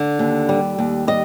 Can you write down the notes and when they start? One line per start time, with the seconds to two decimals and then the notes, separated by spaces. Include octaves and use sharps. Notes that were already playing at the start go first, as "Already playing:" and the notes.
Already playing: D3
0.19 D#2
0.49 G3
0.79 D#2
1.08 G3 D#5